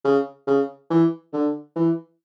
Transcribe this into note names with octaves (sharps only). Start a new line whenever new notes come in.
C#3
C#3
E3
D3
E3